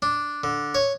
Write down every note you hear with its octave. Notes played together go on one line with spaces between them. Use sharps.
D4
D3
C#5